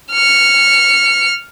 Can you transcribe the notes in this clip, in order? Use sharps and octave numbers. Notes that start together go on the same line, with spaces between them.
F6 C#7